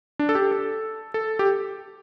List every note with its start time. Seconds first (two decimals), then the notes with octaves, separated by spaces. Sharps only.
0.19 D4
0.29 A4
0.35 G4
0.51 A4
1.14 A4
1.39 G4